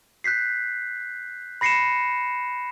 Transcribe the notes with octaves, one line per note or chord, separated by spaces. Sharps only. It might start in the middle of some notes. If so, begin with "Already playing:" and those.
F#6 G6 B6 C7
B5 A#6 C7 C#7 D#7 E7